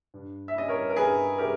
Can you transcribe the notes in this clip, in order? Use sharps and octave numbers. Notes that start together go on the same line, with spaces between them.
G2
E5
G3 C#4 E4 D#5
A#4 C#5
A#4
G2 G#4 B4
G3 C#4 E4 G4 A#4